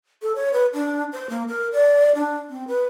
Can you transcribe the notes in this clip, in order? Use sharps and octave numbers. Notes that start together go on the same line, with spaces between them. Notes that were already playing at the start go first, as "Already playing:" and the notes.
A4
C#5
B4
D4
C5
A#3
A#4
D5
D4
C4
B4